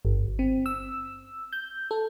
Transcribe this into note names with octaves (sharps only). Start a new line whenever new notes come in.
G1
C4
E6
G6
A4